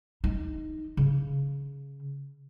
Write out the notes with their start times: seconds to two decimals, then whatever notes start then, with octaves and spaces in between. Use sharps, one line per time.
0.24 D#4
0.97 C#3